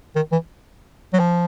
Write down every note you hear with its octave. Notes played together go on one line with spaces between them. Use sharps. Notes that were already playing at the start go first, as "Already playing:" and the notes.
D#3
E3
F#3
F3